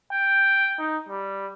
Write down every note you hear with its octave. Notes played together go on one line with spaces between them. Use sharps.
G5
D#4
G3